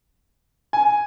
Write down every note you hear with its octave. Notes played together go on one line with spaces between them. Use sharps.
G#5